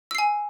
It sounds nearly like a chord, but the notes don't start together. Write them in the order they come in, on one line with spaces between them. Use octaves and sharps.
E6 C7 G#5